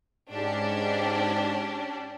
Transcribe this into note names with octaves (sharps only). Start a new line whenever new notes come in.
G#2 C#4 D4 G4